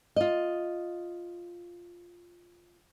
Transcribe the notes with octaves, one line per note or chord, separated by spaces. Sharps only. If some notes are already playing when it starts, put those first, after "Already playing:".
F4 D#5